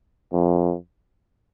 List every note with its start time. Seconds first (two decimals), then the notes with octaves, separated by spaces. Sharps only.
0.33 F2